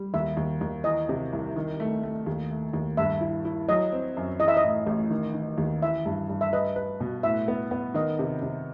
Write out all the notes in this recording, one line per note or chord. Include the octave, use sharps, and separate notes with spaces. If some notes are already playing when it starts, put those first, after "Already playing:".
Already playing: G3
D#2 E5
D#2
D#2
E3 D#5
C3
C2
D#3
A3
A3
D#2
A3
D#2
G2 E5
E4
E4
F#3 D#5
C4
F#2
E3 D#5
E5
D#5
A2
A1
D#3
D#3
D#2
E3 E5
G2
G2
E5
B4 D#5
B4
B2
A2 E5
B3
B3
D#3 D#5
C3
C3